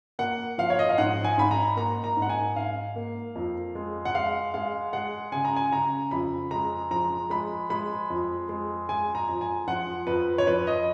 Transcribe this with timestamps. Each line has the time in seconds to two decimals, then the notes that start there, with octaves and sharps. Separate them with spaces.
0.19 A#3 F#5
0.58 F3 F5
0.70 C#5
0.79 D#5
0.89 F5
0.98 G#2 F#5
1.24 G#5
1.38 G#2 B5
1.51 A#5
1.76 A#3 A#5
2.04 A#5
2.17 G#2
2.22 F#5
2.29 G#5
2.56 G#2 F5
2.96 A#3
3.35 F2
3.75 G#3
4.05 F#5
4.15 G#3 F5
4.54 G#3 F5
4.93 G#3 F#5
5.32 C#3 G#5
5.45 A#5
5.56 G#5
5.73 C#3 A#5
6.11 F2 B5
6.51 G#3 A#5
6.91 F3 A#5
7.30 G#3 B5
7.70 G#3 B5
8.10 F2
8.49 G#3
8.89 G#3 G#5
9.15 A#5
9.29 F2
9.41 G#5
9.67 F3 F#5
10.07 F2 B4
10.38 C#5
10.47 F3 B4
10.67 D#5